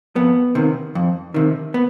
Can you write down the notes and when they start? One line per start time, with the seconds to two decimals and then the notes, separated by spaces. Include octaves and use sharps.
0.16 F2 B3
0.55 C3 D#3
0.95 F2
1.34 C3 D#3
1.74 B3